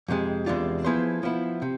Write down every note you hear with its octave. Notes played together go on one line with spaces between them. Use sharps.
F2 C3 G#3
E2 C3 G#3 D4 F4
F3 B3 E4 G#4 C5
F3 B3 E4
C3